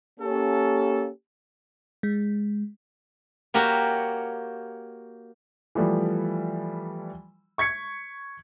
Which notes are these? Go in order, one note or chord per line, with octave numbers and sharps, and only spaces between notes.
A#3 C#4 G4 A4
G#3
A#3 F#4 G4 C#5
E3 F3 G3 A3
C#6 G#6 B6 C#7